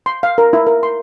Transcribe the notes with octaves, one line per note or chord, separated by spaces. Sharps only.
C6
F5
A#4
E4
A#4
C6